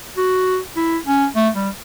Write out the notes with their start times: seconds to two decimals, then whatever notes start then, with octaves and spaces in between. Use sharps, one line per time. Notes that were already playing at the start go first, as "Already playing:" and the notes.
0.17 F#4
0.77 E4
1.06 C#4
1.36 A3
1.55 G3